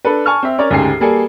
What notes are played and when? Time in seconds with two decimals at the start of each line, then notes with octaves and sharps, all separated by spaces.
0.05 D4 A4 B4
0.26 G#5 A5 C#6 F6
0.43 C4 E5
0.58 C#4 A#4 C#5 D5
0.71 D2 G#2 C#3 G4 G#4 C7
1.00 G3 A#3 G#4 A4